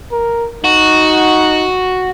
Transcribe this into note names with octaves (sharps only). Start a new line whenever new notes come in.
A#4
D#4 F#4